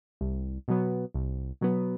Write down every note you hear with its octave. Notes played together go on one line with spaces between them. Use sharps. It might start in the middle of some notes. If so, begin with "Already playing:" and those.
C2
B2 F#3 B3
C2
B2 F#3 B3